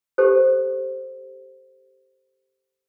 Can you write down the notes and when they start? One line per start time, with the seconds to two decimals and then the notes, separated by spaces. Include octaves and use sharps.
0.18 G4 A4 C5